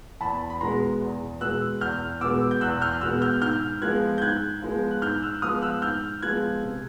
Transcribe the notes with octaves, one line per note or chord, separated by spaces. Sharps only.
E2 A5 B5
B5
B2 G#3 B3 A#5 C6
E2
B2 G#3 B3 E6 F#6
E2 F6 G6
B2 G#3 B3 D6 E6
G6
E2 E6 F#6
F6 G6
B2 G#3 B3 E6 F#6
F6 G6
G#2 F6 G6
F3 G#3 B3 F#6 G#6
G6
G#2 F#6 G#6
F3 G#3 B3
F#6
G#2 F6 G6
E6 F#6
F3 G#3 B3 D#6 F6
E6 F#6
G#2 F6 G6
F3 G#3 B3 F#6 G#6
C3